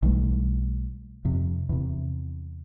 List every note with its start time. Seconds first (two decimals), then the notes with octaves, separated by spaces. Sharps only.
0.02 B1 E3 G3 A3
1.25 F2 C3
1.69 E2 C3